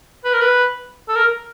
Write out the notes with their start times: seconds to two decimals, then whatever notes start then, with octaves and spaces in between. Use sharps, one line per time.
0.24 B4
0.33 A#4
0.41 B4
1.09 A4
1.16 A#4